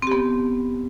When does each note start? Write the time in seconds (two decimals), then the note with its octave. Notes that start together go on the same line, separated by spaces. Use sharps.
0.02 C4
0.07 G4
0.12 B3